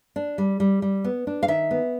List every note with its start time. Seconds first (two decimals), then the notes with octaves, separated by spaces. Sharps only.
0.16 D4
0.38 G3
0.60 G3
0.82 G3
1.04 B3
1.27 D4
1.43 F5
1.48 D#3 E5
1.71 B3